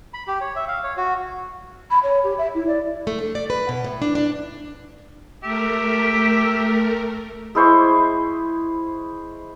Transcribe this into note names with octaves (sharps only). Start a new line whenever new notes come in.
B5
G4
C#5
E5
F5
C#5
F#4
B5
C#5
G4
E5
E4
D5
A3
D4
D5
B4
B2
A2
D4
D4
A3 G4 A#4 E5
G#3 E4 C5 C#6